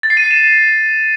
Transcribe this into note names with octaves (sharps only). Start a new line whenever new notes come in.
A6
C7
D#7
C7
E7